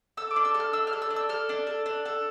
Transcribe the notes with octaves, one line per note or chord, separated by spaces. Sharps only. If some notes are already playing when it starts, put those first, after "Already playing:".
A4 E6
D6
D4
E6
A4
F6
D4 E6
F6
A4
E6
D4
E6
A4 F6
D4
A4
D4
A4